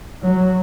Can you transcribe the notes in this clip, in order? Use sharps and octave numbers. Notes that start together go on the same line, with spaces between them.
F#3